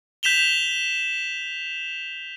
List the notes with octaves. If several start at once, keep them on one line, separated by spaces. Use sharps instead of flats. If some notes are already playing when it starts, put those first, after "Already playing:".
G6 B6 E7 F7 G7